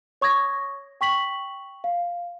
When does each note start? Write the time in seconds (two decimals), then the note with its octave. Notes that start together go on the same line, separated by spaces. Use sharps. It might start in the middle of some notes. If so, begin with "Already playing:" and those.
0.21 C#5 C#6 D#6 G#6 A#6
1.01 G5 C#6 B6 F#7
1.84 F5